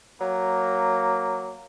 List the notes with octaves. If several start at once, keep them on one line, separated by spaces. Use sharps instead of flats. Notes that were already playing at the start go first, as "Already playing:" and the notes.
F#3 A#3